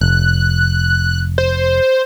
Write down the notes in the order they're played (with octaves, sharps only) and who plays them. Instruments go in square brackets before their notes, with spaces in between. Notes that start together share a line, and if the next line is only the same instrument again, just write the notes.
[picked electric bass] F1 [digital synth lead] F#6
[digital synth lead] C5